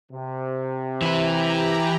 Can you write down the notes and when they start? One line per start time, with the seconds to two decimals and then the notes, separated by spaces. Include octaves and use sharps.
0.12 C3
1.02 E3 E4 G4 A#5